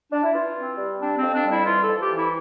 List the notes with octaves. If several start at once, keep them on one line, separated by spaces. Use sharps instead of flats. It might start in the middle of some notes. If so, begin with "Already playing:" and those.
D4
E4
E3 F4
C4
G3
C4 D4
C4
F2
D4
G3
E4
E3 F4
F2 A4
G4
E3 E4